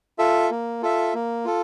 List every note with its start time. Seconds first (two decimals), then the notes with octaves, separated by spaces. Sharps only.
0.19 F4 A4 E5
0.50 A#3
0.82 F4 A4 E5
1.14 A#3
1.45 F4 A4